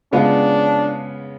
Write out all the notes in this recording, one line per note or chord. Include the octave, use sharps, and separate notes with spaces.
C#3 G#3 B3 D4 F4